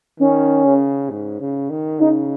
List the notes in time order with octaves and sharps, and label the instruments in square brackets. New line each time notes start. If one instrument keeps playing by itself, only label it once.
[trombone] D#3 [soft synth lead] C#4
[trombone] C#3
G#2
C#3
D#3
[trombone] C#3 [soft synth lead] D#4